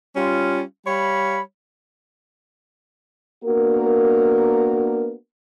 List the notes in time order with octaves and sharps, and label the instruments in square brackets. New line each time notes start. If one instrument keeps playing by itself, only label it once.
[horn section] G3 C#4 F4
G3 C#5 F5 B5
[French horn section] A#3 B3 D4 F#4 A#4